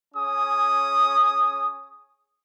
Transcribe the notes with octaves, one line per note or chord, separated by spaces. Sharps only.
C#4 G#4 D#6